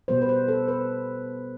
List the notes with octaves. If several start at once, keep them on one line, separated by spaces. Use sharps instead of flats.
B2 G3 B3 C5
B4
C5
A4
B4